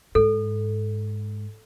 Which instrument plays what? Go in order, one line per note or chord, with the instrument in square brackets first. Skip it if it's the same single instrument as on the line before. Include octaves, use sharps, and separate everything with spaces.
[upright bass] G#2 [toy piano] A4